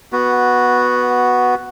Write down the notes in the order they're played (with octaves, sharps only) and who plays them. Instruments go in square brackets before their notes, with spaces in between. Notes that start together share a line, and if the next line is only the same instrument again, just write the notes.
[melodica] B3 F#4